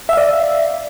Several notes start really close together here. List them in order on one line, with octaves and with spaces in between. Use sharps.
E5 F5 D5